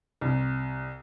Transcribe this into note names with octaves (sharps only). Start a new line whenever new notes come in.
C2